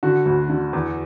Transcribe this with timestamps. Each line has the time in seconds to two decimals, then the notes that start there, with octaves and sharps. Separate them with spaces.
0.03 D3 F#4
0.26 D2
0.50 D3
0.73 E2